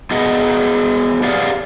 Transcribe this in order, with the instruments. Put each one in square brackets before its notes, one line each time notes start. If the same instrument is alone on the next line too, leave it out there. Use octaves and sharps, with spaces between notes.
[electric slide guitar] B3 F#4 G#4 D#5 F#5
G4 G#4 D5 F5 F#5